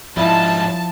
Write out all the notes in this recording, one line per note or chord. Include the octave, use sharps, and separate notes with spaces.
G#2 F3 G3 E4 F4 A5